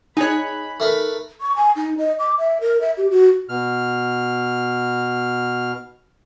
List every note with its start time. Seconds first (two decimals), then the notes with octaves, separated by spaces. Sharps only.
0.17 D#4 G#4 C#5 G#5 B5 F#6
0.80 A3 A#4 B4
1.41 C#6
1.56 G#5
1.76 D#4
1.98 D#5
2.19 D6
2.38 E5
2.61 A#4
2.81 E5
2.97 G4
3.10 F#4
3.49 B2 F6